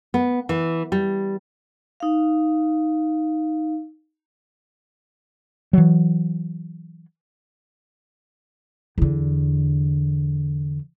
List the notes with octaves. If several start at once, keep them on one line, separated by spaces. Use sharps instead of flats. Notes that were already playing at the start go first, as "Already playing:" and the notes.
B3
E3
G3
D#4 F5
E3 F#3
E2 D3